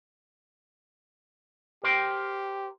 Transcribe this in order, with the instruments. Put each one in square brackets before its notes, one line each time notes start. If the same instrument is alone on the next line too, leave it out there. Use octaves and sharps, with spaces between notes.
[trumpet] G4 [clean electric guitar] A#4 C5 G5